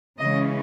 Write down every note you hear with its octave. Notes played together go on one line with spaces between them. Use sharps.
C#3 E3 G#3 C#4 D#5